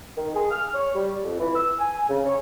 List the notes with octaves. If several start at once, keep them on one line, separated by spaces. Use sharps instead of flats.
D#3
G#4
F6
C#5
G3
F2
E3
E6
G#5
C#3
C#5